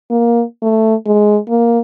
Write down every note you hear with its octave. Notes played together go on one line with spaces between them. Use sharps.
A#3
A3
G#3
A#3